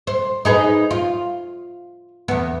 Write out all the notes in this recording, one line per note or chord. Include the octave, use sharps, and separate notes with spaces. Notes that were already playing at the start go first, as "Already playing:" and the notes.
C5
D#4 G#4 B4
F4
E2 B3